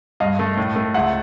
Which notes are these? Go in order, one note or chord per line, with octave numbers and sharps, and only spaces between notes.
G2 D#5 F5
A3
A2
A3
C#2 E5 F#5